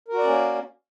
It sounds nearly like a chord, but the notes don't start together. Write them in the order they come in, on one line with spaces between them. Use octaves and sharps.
A#4 F#4 D5 C#4 A#3